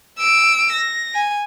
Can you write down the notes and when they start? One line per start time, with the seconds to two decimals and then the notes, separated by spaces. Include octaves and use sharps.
0.18 E6 D7
0.73 A#6
1.15 G#5